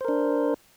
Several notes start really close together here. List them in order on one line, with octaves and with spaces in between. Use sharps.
C5 A#4 D4